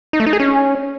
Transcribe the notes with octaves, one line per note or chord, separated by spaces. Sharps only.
D#4
A3
D#4
G#4
C#4